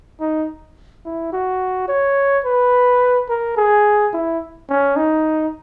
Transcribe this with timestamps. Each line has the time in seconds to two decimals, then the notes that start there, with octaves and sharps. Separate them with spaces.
0.21 D#4
1.05 E4
1.33 F#4
1.89 C#5
2.45 B4
3.29 A#4
3.57 G#4
4.14 E4
4.70 C#4
4.97 D#4